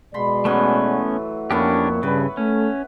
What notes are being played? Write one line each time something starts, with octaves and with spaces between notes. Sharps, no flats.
B2 G#3 D5 B5 C6
A2 E3 F#3 A3 B3 C#4
F2 A#3 B3 C#4 D4 E4 G4 C#5
G2 C#3 B4
A3 C#4